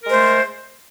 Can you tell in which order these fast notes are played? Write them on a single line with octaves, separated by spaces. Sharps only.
A#4 G#3 C5 A3